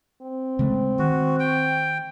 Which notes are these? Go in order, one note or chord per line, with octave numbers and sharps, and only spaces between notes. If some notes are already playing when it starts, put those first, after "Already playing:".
C4
C#3 G#3 A3
D#3 F#4
G5